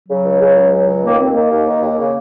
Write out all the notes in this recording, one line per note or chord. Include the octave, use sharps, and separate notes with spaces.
C#3 F#3
C#2
C#3
C#2
C#3
C#2
D#3 A#3
D#2 C4
D#3 A#3
D#2
D#3
D#2
C#3